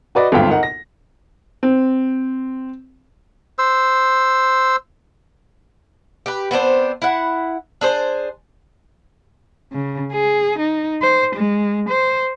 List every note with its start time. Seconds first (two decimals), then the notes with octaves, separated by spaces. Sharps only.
0.15 F#4 B4 D5 D#5
0.32 G#1 D2 G2 B3 F4 G5
0.50 D#4 A#4 F#5
0.63 A#6
1.63 C4
3.59 C5 E6
6.26 G4 B4
6.51 B3 C4 D4 C5
7.02 E4 F#5
7.81 D4 G#4 C5
9.72 C#3
10.12 G#4
10.59 D#4
11.02 C5
11.36 G#3
11.89 C5